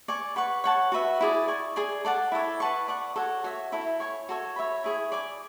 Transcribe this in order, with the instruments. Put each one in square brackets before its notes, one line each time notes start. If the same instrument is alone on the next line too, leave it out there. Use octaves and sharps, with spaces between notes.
[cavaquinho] D5 G#5 C#6
B4 F#5 C#6
C#5 F#5 A5 C#6
F#4 B4 E5
E4 G#4 D5
D5 G#5 C#6
G#4 D5 G#5
A4 D5 F#5 A5
E4 A4 C#5
B4 F#5 A5 C#6
D5 F#5 C#6
F#4 A4 C#5 F#5
F#4 C#5 E5
E4 A4 E5
C#5 G#5 C#6
F#4 A4 C#5
C#5 E5 B5
E4 G#4 C#5
D5 G#5 D6